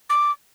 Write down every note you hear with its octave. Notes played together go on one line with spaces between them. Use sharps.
D6